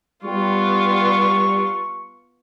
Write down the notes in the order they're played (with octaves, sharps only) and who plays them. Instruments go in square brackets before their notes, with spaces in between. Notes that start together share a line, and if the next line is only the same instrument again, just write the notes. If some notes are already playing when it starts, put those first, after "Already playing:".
[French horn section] G3 [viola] B3 F4 [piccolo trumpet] C#6